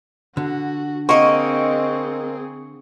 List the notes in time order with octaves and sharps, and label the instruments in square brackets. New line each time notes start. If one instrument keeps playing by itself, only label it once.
[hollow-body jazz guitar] D3 [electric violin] F#4
[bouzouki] A#3 D#5 [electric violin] C4 G#4 [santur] C#6